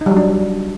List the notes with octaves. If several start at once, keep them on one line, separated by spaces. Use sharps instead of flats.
D#4
G3
F#3
D4